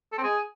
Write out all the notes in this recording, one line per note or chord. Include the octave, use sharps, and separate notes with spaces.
A4
C4
G#4